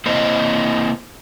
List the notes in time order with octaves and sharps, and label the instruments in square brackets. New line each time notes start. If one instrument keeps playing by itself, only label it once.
[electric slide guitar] A#3 C4 E4 C5 D#5